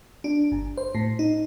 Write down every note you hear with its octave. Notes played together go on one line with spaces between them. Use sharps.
D4
G1
C5
A2
D#4